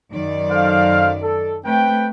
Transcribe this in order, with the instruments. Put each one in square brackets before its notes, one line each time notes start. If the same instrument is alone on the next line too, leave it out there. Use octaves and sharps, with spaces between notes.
[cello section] F#2 D#3 D5
[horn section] A4 C5 F5
A4
[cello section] A3 [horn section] C4 B4 G5